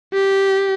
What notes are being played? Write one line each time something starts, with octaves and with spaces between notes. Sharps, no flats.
G4